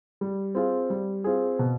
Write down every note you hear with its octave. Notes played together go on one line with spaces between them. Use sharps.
G3
C4 F4 G#4
G3
C4 F4 G#4
B2